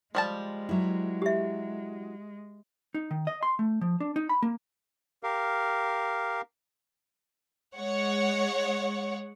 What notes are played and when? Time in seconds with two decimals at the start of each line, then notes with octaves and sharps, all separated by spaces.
0.15 F3 G3 G#3 A5
0.69 F#3 E4
1.22 G4 E5
2.95 D#4
3.11 D#3
3.27 D#5
3.43 C6
3.59 A3
3.81 F3
4.00 D4
4.16 D#4
4.29 B5
4.42 A#3
5.23 G4 A#4 F5
7.76 G#3 C#5 F#5